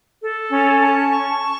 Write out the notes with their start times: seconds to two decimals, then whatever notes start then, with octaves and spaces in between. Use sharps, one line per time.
0.21 A4
0.51 C#4
0.81 A5
1.11 C#6
1.40 A5